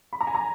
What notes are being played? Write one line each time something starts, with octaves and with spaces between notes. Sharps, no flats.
B5
A#5
G#5
A#5